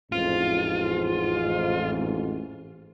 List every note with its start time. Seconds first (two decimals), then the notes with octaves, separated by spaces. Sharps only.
0.12 A1 F2 G#2 F4